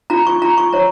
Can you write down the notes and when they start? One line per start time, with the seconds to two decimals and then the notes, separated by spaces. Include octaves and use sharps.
0.10 F4 A#5
0.27 C#6
0.41 F4 A#5
0.58 C#6
0.73 C#5 A#5